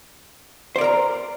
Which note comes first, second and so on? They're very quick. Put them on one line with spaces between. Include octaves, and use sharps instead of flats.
C5 D5 A#4 A#5